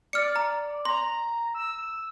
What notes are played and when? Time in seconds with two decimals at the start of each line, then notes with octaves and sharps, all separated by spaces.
0.13 D5 F6 C#7
0.36 A#5
0.85 A#5 C6
1.55 E6